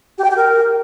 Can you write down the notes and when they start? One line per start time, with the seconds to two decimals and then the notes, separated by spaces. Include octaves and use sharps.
0.18 G4
0.24 G5
0.30 G4
0.36 A#4